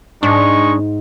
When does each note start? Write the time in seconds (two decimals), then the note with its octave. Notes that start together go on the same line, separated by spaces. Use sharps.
0.23 G#2 G#3 D4 D#4 C#6